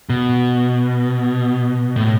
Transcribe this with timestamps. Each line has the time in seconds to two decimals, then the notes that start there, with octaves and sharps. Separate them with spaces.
0.10 B2
1.96 A2